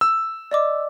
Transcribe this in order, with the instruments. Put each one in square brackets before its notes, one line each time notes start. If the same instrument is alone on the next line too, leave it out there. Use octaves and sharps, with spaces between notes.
[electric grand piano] E6
[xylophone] D5 D#5 D6